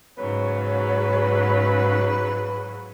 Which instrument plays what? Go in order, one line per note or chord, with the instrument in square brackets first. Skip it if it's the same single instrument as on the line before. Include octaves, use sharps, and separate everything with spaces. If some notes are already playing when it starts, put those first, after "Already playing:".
[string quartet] G#2 C#3 F#3 [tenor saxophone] B4 [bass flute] C#5